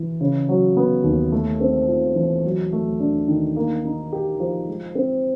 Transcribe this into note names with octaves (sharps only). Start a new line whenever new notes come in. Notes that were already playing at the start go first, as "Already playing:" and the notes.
Already playing: E3
C#3
F#3
B3
D#2
A3
C4
F4
E3
F#3
A3
D4
D#3
A#3
D#4
G4
F3
G#3
C4